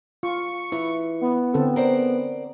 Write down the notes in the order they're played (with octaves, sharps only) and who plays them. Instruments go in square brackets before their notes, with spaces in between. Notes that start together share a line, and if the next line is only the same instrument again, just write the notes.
[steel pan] F4 [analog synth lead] C#6
[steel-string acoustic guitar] E3 [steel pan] E4
[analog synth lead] B3
[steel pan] D3 C4 A4
[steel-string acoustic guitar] A#4 C5 D5